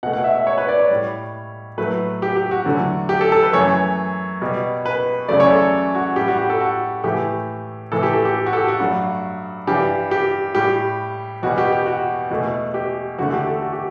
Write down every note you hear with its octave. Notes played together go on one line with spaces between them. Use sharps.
B2 A3 F#5
F#5
E5
E5
C#5
B4
D5
C#5
A2 G3
A2 F#3 A3 B4
G4
G4
F#4
E2 D3 F#3 A3
G4
A4
A4
B4
F#2 E3 A3 C#5
B2 G3
B4
E2 C#3 F#3 A3 D5
C#5
A4
F#4
A2 G3 G4
F#4
G4
A4
F#4
A2 E3 A3 G4
A2 E3 A3 A4
G4
A4
G4
F#4
A4
G4
F#4
G2 F#3 A3
G2 E3 G3 G4
G4
A2 G3 G4
E2 B2 G3 F#4
G4
G4
F#4
E2 B2 A3
G4
E2 D3 A3 F#4
G4
A4
F#4
G4